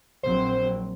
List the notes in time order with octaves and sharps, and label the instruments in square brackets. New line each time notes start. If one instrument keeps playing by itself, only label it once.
[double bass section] A#1 F#3 C4 [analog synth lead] C5